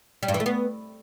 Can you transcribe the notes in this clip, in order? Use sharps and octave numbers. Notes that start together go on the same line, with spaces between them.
G3
G2
E3
A3
B3